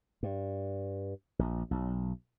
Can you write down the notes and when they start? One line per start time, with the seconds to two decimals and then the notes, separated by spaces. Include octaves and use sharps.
0.23 G2
1.39 A#1
1.71 B1